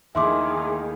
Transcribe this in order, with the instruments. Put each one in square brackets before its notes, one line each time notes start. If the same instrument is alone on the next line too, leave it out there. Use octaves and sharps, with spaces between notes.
[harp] D#2 E4 [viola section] D#3 A3 G#4 [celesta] E5 C6 D6